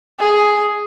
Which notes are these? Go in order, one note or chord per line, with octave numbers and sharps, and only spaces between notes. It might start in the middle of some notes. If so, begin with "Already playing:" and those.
G#4